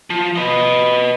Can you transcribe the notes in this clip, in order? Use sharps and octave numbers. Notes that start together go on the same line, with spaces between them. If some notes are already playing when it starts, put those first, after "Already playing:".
F3
B4 D#5